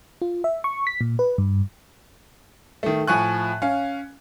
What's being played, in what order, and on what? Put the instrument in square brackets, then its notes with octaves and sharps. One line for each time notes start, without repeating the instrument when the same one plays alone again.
[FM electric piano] F4
E5
C#6
B6
A#2
B4
G2
[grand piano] D#3 A3
A2 F3 G#5 C#6 F#6
C#4 F5